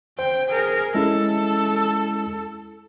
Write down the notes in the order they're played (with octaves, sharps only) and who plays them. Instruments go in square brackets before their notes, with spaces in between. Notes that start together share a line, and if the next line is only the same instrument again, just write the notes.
[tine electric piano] C5 [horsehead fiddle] G5
[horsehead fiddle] G#4 A#4
[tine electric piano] G#3 C#4 E4 [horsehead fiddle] A4